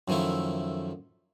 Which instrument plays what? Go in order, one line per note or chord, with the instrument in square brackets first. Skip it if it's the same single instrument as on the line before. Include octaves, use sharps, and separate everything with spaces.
[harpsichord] F#2 D#3 F3 A3 E4